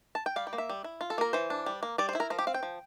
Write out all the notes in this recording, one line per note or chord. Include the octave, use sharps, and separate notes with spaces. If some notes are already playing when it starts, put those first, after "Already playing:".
A5
G5
G3 F5
G5
A#3
E5
G3
E4
F4
A4
A#3 A#4
E3 C5
D4
G3
A#3
G3 D5
C5
E4 A#4
F3 A#4
G4
C4 F5
G5
F3